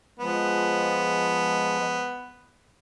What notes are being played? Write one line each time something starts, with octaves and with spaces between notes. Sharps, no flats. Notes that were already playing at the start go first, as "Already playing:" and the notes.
F3 G#3 B3